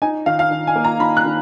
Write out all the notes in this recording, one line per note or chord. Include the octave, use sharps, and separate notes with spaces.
D#4 G#5
D#3 F5
F5
D#3
G#5
A#3
A#5
D#3 B5
F#6
D#3